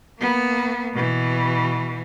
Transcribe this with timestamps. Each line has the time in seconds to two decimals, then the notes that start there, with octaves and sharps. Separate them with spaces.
0.20 A#3 B3
0.94 B2 E3